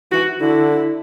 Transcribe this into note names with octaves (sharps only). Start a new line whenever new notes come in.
E3 F#4
D3 E4